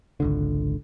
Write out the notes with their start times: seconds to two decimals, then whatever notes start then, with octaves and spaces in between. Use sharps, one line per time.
0.20 G#1 C#2 D3